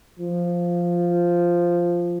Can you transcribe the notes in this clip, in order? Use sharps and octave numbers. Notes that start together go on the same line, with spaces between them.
F3